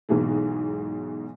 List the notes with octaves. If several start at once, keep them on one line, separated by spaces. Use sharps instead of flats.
B1 G#2 B2 E3 G#3